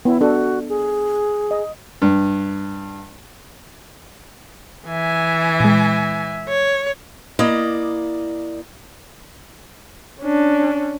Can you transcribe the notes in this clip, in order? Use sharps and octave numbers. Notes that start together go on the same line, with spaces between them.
B3 E4
D4 F#4 A4
G#4
D#5
G2
E3 E5 G#5
A#2 G#3
C#5
A#3 E4 D5 D#5
C#4 D4